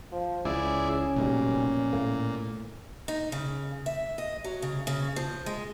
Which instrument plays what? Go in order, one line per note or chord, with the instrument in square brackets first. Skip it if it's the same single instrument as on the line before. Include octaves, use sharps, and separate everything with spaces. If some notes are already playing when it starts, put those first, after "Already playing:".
[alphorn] F3
[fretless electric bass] C#2 [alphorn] C#4 [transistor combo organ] E4 G#4 D5
[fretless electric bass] F1 B1 G3 [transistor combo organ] A#2
[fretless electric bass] A2 A3 A#3
[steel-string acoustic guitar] D#4
C#3
E5
D#5
F#3
C#3
C#3
F3
G#3